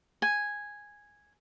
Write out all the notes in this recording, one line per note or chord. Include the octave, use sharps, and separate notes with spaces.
G#5